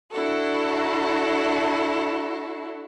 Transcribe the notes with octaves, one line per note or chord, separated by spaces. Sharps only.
D4 E4 F#4 A4